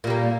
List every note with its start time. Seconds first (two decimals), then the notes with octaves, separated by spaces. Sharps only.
0.04 A#2
0.07 G3
0.10 A#3